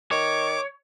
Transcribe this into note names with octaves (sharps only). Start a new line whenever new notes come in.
D#3 C#5 D6